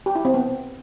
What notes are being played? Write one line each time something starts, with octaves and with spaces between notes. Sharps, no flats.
G4
E4
C4
B3